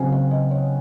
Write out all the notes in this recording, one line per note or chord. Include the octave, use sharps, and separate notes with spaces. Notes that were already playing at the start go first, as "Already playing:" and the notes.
Already playing: C#3 F#3 C4 F5 F#5 G#5
F5
D#5
C#5